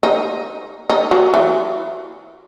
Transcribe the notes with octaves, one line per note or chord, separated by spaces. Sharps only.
D#4
D#4
F#3
E3